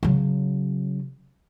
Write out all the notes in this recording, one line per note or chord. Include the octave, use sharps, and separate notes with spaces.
C#3 F#3